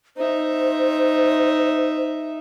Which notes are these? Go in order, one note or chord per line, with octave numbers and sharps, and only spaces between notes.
D#4 C5 E5